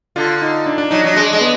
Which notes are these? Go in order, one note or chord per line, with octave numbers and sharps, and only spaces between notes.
D3 F4
D#4
D4
D4
F#3 D#4
F#3 D#4
G#3 D4
G#3
B3